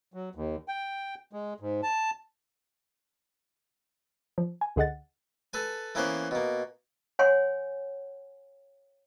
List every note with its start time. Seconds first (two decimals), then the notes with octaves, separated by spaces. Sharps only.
0.14 F#3
0.35 D#2
0.68 G5
1.33 G#3
1.60 G#2
1.83 A5
4.38 F3
4.61 G#5
4.76 C#2 D3 G#4 D#5 F#5 A6
5.53 A4 B4 G#5
5.95 E3 A#3 B3 C#4 C5 F#5
6.31 B2 A#3
7.19 C#5 F#5 G#5 C6